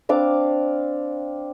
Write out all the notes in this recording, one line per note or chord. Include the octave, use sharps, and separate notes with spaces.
C4 D4 F5 D6